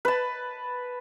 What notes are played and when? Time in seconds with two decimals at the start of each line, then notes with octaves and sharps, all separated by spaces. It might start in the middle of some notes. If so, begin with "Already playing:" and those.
0.05 B4 A5